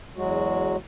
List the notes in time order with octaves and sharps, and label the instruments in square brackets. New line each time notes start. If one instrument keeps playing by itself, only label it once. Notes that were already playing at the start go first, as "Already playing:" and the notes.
[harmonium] E2 F#3 G#3 F#4